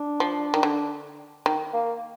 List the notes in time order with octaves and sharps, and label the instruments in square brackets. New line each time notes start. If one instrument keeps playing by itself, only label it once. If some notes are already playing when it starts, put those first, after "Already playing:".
Already playing: [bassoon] D4
[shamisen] F3
D#3
D3
D#3
[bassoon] A#3